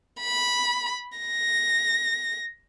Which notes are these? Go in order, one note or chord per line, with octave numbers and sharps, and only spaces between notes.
B5
A#6